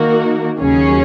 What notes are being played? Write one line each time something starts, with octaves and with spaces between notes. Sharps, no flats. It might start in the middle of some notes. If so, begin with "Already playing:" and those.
Already playing: D#3 A#3 D#4 F#4 A#4
D#2 C#3 F#3 C#4 G#4